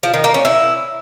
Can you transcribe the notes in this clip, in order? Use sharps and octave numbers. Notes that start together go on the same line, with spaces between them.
F3
D#3
A#3
C#4
E4